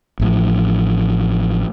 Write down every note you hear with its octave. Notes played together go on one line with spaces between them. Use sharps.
A1 A2 F3